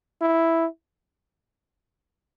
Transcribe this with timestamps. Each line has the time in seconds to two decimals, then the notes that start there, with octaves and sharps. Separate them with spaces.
0.22 E4